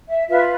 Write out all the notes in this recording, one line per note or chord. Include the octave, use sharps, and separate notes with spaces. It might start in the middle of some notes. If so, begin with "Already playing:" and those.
E5
F4 B4 E5